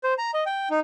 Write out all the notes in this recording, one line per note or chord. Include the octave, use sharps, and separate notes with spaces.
C5
A#5
D#5
G5
D#4